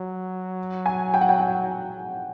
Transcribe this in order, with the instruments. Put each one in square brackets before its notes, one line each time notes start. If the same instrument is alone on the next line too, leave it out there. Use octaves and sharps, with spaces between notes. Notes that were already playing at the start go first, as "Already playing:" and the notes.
Already playing: [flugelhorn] F#3
[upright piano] G#5
G5
F#5
G5
F#5